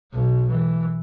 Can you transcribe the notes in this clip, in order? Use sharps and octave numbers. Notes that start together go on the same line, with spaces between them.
B1 B2
E3